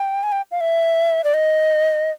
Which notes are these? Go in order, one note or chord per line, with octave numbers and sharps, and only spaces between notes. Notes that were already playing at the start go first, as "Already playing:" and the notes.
Already playing: G5
G#5
G5
F5
E5
D5
D#5